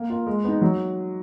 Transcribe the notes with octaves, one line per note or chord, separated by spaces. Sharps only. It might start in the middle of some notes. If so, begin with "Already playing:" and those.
Already playing: A#3
F4 A#4
G#3
B3 D#4
F#3